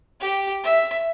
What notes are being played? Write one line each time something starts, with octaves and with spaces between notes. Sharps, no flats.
G4
E5